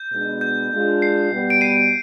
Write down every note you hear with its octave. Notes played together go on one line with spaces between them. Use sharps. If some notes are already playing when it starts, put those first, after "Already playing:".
Already playing: G6
B2 G#3 D4
G6
G#3 D4 F4
C7
B2 G3 B3
D7
C7 D#7